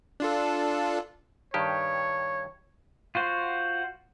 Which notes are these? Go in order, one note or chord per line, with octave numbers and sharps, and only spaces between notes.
D4 F4 A4
G2 D#3 G4 C#5
F4 F#4 C5